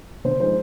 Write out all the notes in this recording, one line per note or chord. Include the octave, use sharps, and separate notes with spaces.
D3 C5
F3 G#3 D#4 C5